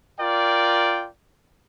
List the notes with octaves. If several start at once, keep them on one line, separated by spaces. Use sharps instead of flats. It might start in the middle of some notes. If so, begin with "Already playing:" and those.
F4 A#4 D5 G5